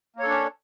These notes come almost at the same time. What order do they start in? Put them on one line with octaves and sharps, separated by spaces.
A#3 C#5 A4 D4 C#4